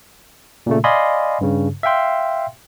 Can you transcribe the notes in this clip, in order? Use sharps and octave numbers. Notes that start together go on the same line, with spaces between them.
A#2 C#3 A3
D5 D#5 F5 G#5 B5 C6
G2 C#3
E5 F5 G5 C6